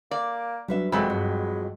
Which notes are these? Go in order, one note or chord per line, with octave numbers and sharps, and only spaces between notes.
A#3 D5
F#3 G3 D4 B4 E5
F2 C3 E3 F#3 G#3 A3 B5
G2 G#3